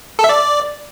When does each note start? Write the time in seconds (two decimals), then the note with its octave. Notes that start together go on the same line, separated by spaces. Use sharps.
0.19 A4
0.24 E5
0.29 D5